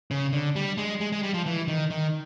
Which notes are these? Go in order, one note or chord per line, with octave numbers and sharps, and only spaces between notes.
C#3
D3
G3
G#3
G#3
G#3
G3
F3
E3
D#3
D#3